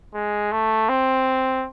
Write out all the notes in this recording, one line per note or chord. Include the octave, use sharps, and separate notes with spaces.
G#3
A3
C4